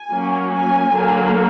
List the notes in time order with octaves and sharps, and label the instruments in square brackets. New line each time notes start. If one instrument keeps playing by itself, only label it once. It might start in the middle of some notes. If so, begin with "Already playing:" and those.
Already playing: [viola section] G#5
F#3 A#3 C#4
G#5
D3 F#3 A#3